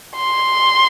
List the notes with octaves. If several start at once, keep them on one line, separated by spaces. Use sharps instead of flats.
C6